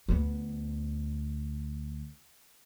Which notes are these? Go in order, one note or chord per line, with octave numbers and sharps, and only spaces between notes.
D2 B3